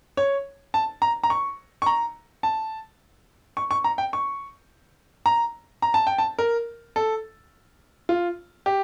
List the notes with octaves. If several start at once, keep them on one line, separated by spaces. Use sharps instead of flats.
C#5
A5
A#5
A#5
C#6
C#6
A#5
A5
C#6
C#6
A#5
G5
C#6
A#5
A#5
A5
G5
A5
A#4
A4
F4
G4